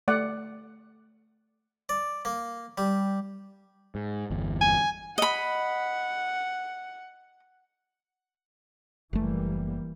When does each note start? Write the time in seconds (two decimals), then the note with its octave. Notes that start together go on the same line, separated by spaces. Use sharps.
0.08 A3 D5 F#5
1.89 D5
2.25 A#3
2.78 G3
3.95 G#2
4.31 G1 E2
4.61 G#5
5.18 D#5 F#5 B5
9.13 F#1 E3 G3 A3 A#3